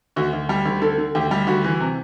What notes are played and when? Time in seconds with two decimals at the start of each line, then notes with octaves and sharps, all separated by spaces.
0.16 D2 F#4
0.33 D2
0.49 G3
0.65 D2
0.82 D3 A4
0.98 D3
1.15 D2 G4
1.31 G3
1.47 D2 F#4
1.64 E3
1.80 C3